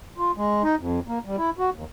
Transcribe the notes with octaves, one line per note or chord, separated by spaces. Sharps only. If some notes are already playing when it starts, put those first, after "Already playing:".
F4
G#3
D#4
F2
A#3
G3
E4
F#4
D#2